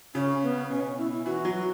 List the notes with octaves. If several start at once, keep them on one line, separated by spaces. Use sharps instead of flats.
C#3 C#4
B3
B2 C#4
C#4
E4
E4
E3 F#4
F#3